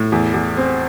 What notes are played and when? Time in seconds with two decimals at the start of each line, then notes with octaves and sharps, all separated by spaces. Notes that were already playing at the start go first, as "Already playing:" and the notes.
Already playing: A2
0.12 E2
0.34 E2
0.57 C4